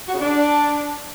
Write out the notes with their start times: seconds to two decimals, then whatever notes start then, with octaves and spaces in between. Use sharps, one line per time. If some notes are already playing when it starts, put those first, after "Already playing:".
0.08 F#4
0.14 C#3
0.20 D4